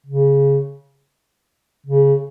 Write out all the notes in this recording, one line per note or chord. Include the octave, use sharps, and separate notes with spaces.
C#3
C#3